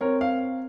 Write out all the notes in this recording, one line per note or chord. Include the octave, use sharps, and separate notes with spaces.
C4 A#4 C#5
F5